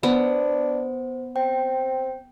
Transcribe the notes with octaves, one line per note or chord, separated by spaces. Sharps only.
B3 D4 C5
C4 G5